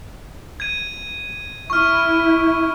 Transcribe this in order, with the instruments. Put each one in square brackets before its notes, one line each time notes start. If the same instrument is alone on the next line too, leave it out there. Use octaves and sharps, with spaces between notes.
[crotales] G#6 D#7
[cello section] E4 [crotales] C#6 F6